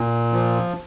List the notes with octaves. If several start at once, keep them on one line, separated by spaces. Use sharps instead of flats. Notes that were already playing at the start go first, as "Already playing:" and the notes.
Already playing: A#2
F3